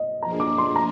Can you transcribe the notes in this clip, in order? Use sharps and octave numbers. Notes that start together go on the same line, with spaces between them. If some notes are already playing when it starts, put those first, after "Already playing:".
Already playing: D#5
F3 A#3 D4 G#4 A#5
D6
C6
A#5